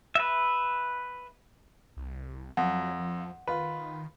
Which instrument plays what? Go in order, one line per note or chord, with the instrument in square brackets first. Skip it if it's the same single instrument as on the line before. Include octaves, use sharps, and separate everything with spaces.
[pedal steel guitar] B4 E5
[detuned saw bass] C2
[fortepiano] F2 [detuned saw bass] F#3 [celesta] F#5
[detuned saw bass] F3
[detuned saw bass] D#3 [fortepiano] F4 B4